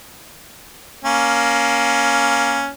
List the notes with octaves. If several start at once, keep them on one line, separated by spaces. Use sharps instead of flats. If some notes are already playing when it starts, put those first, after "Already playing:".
A#3 C#4